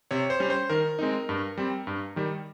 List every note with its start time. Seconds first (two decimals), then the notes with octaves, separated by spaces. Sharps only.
0.11 C3 C#5
0.30 C5
0.40 G3 C#4
0.50 C5
0.70 D#3 A#4
0.99 G#3 C4 D#4
1.29 G2
1.57 G3 C4
1.87 G2
2.16 D#3 G3